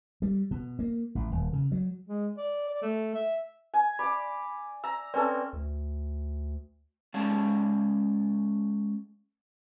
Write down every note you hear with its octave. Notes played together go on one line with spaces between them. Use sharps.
G3
B2
A#3
A1
D#1
C#3
F#3
G#3
D5
D5
A3
E5
G#5
D5 B5 D6
A#5 E6
C4 C#4 A4 B4 D5
D2
G#3 C#4 D5 F5 A5